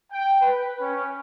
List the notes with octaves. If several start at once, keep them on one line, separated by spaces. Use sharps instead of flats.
G5
B4
C#4